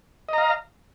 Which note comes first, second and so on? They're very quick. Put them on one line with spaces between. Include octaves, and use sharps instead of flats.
D#5 A#5 F5